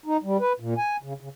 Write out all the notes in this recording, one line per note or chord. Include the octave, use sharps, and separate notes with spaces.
D#4
G3
B4
A#2
G#5
C#3
C#3